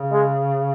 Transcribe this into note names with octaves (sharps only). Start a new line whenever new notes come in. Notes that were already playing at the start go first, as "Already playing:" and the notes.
Already playing: C#3
G#3